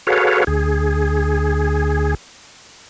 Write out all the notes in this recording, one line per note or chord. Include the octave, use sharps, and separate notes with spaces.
F#4 G#4 A4 B4 C#5 F5
D2 G#4